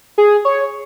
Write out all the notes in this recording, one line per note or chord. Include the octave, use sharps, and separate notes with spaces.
G#4
C#5